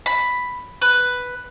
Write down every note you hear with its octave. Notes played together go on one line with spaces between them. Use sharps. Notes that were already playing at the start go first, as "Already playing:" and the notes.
B5
B4